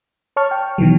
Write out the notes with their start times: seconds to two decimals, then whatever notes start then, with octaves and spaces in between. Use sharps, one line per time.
0.36 C#5 A5 C#6 F6
0.51 G5
0.78 B2 D#3 E3 F#3